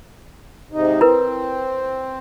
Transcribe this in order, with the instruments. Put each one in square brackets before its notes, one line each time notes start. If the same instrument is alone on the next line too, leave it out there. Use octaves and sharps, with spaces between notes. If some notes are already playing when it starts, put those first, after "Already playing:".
[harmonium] G#2 C3 D#4
[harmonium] C4 [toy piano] E4 A#4 B4